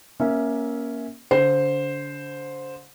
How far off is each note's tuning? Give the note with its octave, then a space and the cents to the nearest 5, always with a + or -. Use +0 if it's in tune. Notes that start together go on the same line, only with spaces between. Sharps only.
A#3 +15 C#4 +0 E5 -15
D3 -35 C5 +0